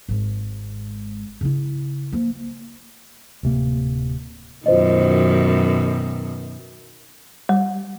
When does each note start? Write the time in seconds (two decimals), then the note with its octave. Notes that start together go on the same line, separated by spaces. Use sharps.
0.09 G#1 G#2
1.41 C#3 E4
2.12 F3 A#3
3.43 D1 C3 A#3
4.66 F#2 B2 D#3 F4 C5 D#5
7.49 G3